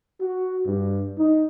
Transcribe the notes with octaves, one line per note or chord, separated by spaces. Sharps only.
F#4
G2
D#4